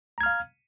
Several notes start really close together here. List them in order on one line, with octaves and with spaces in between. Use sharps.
A#5 G#6 F6 F5